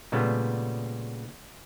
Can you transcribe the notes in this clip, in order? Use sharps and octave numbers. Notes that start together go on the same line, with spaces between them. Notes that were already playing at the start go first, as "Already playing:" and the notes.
A#2 C#3 G3 A3 B3